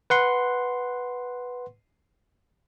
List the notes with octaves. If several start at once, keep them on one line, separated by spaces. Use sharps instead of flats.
B4 F#5 C6